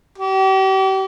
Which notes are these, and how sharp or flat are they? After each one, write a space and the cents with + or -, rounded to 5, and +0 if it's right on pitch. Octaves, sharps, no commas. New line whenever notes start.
G4 -40